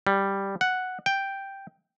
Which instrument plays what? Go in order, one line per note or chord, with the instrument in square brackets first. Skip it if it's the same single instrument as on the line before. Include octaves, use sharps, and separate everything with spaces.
[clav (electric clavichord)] G3
F#5
G5